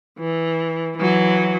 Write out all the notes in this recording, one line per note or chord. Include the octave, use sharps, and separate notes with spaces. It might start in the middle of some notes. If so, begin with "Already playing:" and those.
E3
E3 F#3